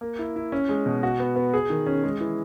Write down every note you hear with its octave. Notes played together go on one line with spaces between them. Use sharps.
A#3
E4
E4
C#4
G#3
B2
F#4
B3
B3
G#4
D#3
C#4
G#3
E3